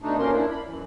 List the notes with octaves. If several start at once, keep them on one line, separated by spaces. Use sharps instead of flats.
B2 A3 D4 D#4
G2 F3 A#3 C#4 A#4 C6
D4 E4
B5
F#2 E3